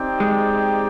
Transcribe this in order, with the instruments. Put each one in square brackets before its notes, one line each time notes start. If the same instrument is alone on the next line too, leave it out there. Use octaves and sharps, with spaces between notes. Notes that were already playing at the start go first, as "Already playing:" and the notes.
Already playing: [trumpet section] C4 D#4 G4 D5 G5
[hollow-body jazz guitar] G#3